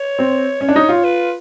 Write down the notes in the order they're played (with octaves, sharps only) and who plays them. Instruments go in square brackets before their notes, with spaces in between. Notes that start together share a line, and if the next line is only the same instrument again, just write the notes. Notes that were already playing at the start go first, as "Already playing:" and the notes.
Already playing: [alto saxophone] C#5
[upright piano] C4
C#4
D4
D#4
F4
[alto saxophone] B4